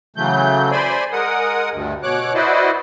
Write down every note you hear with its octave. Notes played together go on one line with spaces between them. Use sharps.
C#3 E3 F#3 A3 G6
C5 D5 G#5 B5 C6
G#3 A#4 F#5 D#6
D2 G2
B2 C#5 D6 F#6
E4 F#4 B4 C5 D5 D#5